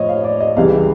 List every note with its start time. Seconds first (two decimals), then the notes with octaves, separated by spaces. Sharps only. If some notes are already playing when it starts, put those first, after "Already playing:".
Already playing: A2 F3 C#5 D#5
0.09 F5
0.24 D5
0.41 D#5
0.56 C#2 C#3 E3 G3 F5